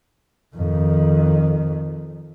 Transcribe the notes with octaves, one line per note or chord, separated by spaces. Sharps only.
F2 D#3